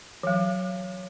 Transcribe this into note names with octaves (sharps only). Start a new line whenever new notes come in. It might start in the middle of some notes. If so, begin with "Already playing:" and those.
E3 F#3